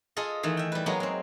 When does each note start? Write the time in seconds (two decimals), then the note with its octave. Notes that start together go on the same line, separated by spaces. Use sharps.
0.17 F4 G#4 A4 D#5
0.43 D#3 E3 A3
0.57 E5 G5
0.72 G3 B4
0.86 F#3 G#3 A#3 B3 G#4 C#5
1.00 F#3 C4